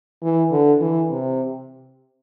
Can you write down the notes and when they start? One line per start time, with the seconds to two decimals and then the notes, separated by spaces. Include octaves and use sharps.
0.23 E3
0.52 D3
0.81 E3
1.10 C3